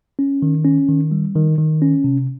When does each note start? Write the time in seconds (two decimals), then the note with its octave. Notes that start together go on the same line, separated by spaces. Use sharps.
0.19 C#4
0.42 D#3
0.65 C#4
0.89 D#3
1.11 G3
1.35 D#3
1.58 D#3
1.82 C#4
2.04 C3